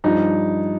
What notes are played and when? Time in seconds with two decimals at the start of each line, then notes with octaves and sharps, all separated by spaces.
0.04 G2 F3 D#4